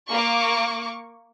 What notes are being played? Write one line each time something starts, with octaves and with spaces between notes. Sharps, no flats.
A#3 C#6 D6